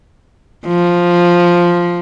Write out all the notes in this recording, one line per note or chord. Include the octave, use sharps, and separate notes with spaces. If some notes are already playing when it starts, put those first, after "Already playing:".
F3